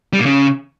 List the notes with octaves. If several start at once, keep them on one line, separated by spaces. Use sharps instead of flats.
G3
A#2
C#3